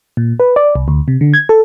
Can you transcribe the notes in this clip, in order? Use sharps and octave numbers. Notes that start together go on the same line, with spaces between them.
A#2
B4
D5
C2
D2
C3
D3
G#6
A4